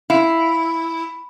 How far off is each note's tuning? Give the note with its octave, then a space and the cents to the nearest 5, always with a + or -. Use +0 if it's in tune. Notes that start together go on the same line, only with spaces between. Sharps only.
E4 +0 F5 +0